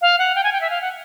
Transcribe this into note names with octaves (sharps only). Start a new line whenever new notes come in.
F5
F#5
G5
G#5
G5
E5
F5
F#5